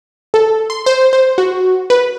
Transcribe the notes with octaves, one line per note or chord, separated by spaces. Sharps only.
A4
C6
C5
C5
F#4
B4